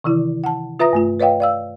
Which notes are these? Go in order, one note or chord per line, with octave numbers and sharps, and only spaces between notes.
C3 D#3 E3 E4
F#5 A5
F4 B4 E5 A#5 D#6 A#6
G2 A3 F4
B4 C#5 D#5 F5 G5
D5 F5 E6